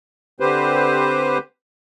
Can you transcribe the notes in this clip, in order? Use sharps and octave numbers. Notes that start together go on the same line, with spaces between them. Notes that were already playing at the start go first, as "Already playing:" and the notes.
D3 C4 G4 B4 C5